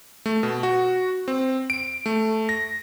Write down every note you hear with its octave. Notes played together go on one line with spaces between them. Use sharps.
A3
B2
F#4
C4
D7
A3
A#6